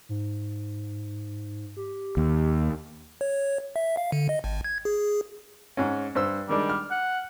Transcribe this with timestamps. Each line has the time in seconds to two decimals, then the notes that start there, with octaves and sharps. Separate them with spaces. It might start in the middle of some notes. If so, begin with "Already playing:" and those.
0.09 G#2
1.77 G4
2.17 D#2
3.21 C#5
3.76 E5
3.97 F5
4.12 D3
4.29 D#5
4.44 G#1
4.64 G#6
4.85 G#4
5.77 G#2 C#4
6.15 G2 C5 E6
6.49 D#3 G3 G#3 D4
6.69 F6
6.91 F#5